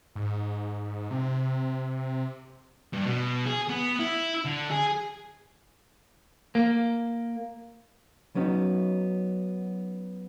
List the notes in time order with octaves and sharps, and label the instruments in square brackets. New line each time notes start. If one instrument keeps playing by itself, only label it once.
[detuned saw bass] G#2
C3
[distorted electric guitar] G2
B2
G#4
B3
E4
D3
G#4
[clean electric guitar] A#3
[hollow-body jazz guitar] F#3 B3 C#4 D#4